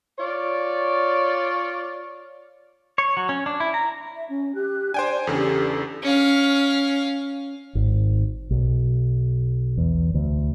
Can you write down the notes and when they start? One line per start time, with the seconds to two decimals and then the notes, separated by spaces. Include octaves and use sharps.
0.19 F4 C#5 D5
2.98 C#5
3.17 F#3
3.29 C#4
3.46 D4
3.60 E4
3.74 A#5
4.13 E5
4.28 C#4
4.54 G4 F#6
4.94 D4 C5 D5 G5 G#5
5.27 E2 C#3 D4 G4 A4
6.03 C#4 F5
7.75 G#1
8.51 B1
9.77 E2
10.14 D2